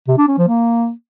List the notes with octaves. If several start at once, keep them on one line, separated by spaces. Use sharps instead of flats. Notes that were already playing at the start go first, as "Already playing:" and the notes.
C3
D4
C#4
F3
A#3